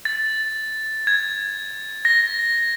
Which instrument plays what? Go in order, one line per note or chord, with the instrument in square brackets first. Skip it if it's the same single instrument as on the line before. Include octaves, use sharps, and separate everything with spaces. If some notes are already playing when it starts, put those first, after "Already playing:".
[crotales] A6
G#6
A#6